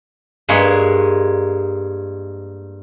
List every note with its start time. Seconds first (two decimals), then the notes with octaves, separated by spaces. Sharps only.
0.49 G2 G#3 A#3 G#4 C#5